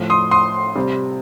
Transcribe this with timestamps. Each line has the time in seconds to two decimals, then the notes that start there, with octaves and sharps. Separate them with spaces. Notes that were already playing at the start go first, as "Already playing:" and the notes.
Already playing: A2 F3
0.10 C6 D#6
0.31 C6 D#6
0.75 C3 G3